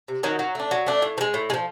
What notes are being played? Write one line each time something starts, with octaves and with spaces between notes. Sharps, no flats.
C3
D#3 F#3
F#3
A3 D4
F#3
A3 D4
A2
F3
G#3
A2
G#3
F3